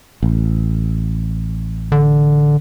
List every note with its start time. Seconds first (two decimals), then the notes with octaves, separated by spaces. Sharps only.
0.23 A1
1.92 D3